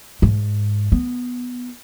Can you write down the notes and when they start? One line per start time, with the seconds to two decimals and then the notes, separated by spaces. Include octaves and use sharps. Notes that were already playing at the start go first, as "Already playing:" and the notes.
0.22 G#2
0.92 B3